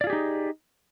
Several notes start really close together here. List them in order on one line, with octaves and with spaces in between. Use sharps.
D5 F4 G#4 G4 D#4